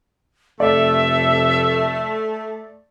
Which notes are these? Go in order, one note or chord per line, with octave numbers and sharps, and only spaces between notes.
F1 A3 D5 E5